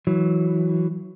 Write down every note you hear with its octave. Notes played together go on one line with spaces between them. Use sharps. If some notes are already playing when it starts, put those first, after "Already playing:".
E3 F#3